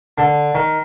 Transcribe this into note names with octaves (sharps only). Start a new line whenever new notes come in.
D3
D#3